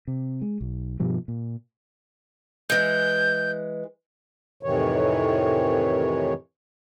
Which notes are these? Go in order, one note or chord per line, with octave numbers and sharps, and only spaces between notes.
C3
G#3
B1
G2 B2 F3 G3
A#2
E3 G#3 G6
F2 A2 C3 D#3 E3 C#5